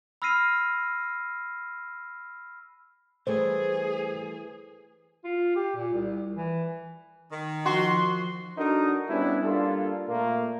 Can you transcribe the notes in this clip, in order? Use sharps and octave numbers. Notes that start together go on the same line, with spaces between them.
B5 E6 F6 A#6 C7 D#7
E3 G3 A3 G#4 C5
F4
G4
A#2
C2
E3
D#3
F3 F#4 C6
D4 D#4 F#4 A4 A#4
G3 B3 C#4 D4 E4
G3 A#3 D4 F4 A4
A#2 A3 A#3